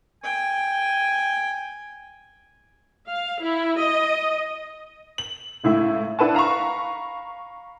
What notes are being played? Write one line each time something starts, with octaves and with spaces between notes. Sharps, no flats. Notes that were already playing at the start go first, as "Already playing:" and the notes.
G5 G#5
F5
E4
D#5
F#7
C#2 A2 E4 E5
D4 E4 B4 F#5 A5
F5 A#5 B5 C#6